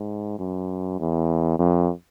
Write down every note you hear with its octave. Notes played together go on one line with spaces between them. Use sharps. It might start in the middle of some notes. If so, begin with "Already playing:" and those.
Already playing: G#2
F#2
E2
F2